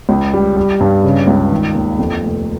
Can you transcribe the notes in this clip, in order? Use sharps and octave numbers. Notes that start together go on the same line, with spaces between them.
C#2
G3
G3
G2
C#3
C#2
D#3
D#2
F2
F1